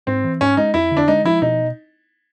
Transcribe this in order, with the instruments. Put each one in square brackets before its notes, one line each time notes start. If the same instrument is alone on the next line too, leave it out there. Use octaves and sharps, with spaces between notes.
[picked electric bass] G#2 [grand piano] C4
[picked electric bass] E3
[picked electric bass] G#2 [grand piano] C#4
[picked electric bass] G#3 [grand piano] D#4
[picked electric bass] F2 [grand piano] E4
[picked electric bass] D3
[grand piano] D4
[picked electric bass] G#3 [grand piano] D#4
[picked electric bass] F3 [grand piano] E4
[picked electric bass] B2 [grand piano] D#4